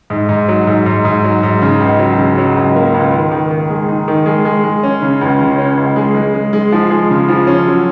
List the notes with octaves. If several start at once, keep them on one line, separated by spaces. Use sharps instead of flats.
G#2
G#2
F#3
G#2
G#2
G#2
F#3
G#2
C#3
C#2
F#3
C#3
F#3
C#2
A#3
C#2
D#3
D#3
D#3
G#3
D#4
D#3
G#3
G#3
G#3
C#4
C#3
C#2
C#3
C#4
C#2
G#3
G#3
G#3
G#3
F3
G#3
C#3
F3
C#4
F#3